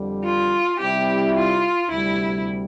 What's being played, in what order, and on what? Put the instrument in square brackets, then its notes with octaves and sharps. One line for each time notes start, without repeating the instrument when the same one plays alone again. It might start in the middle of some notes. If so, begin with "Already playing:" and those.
Already playing: [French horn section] F2 D3 G3
[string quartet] F4
[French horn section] C3 G3 C4 E4 [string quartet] G4
[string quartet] F4
[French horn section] D2 C3 G3 [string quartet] E4